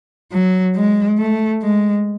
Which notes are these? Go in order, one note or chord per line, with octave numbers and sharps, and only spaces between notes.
F#3
G#3
A3
G#3